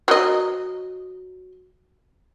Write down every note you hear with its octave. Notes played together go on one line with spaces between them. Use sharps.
F#3 D#5